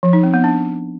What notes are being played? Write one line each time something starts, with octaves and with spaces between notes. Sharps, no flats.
F3
D#4
C4
B3
D4